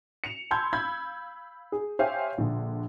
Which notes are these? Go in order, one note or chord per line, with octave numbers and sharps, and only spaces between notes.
C#7 E7 F7
A5 B5 C6 E6 G6 G#6
F5 B5 E6 G6 G#6
G#4
G4 C5 C#5 E5 F5 G#5
A#1 D3